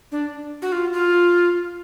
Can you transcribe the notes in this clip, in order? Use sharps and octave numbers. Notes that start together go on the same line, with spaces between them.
D4
F#4
F4
F4